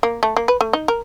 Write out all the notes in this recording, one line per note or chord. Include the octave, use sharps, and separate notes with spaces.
A#3
A3
A#3
B4
A3
D#4
A#4